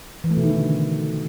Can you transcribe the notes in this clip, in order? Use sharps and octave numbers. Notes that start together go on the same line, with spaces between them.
E3
A3
B2
D#3
D3